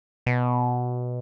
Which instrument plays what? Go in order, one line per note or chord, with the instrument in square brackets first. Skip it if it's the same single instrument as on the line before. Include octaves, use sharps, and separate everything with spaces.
[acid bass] B2